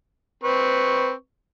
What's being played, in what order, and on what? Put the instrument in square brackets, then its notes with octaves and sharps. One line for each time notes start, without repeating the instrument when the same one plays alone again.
[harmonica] C4 B4 C#6